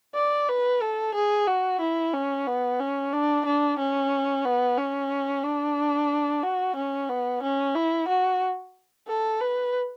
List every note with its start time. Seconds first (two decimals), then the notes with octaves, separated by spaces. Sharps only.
0.15 D5
0.49 B4
0.82 A4
1.15 G#4
1.47 F#4
1.81 E4
2.14 C#4
2.47 B3
2.80 C#4
3.13 D4
3.45 D4
3.79 C#4
4.45 B3
4.77 C#4
5.44 D4
6.43 F#4
6.76 C#4
7.09 B3
7.43 C#4
7.75 E4
8.08 F#4
9.08 A4
9.41 B4